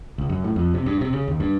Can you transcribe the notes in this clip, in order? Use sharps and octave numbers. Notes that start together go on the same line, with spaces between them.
C#2
F#2
A2
F2
C3
G2
C3
C#3
D#2
G2